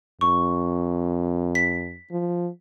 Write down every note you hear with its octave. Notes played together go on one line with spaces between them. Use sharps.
F2 C#6
B6
F3